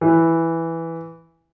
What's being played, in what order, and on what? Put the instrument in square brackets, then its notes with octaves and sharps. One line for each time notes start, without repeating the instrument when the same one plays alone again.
[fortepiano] E3